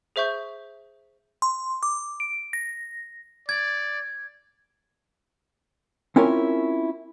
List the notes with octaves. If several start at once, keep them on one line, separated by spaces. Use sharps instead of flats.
G#4 C5 E5 C#6 G6
C6
D6
D7
A#6
D5 G#6
C4 C#4 E4 F4 A#4 C#5